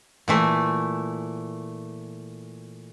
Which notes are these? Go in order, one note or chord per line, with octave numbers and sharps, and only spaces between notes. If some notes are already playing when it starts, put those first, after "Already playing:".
A#2 E3 A3